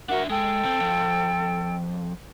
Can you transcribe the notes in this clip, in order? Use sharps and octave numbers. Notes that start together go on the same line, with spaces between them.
D4 F#4 A#4 E5 F#5
G#3 A4 G5
B1 C4
F2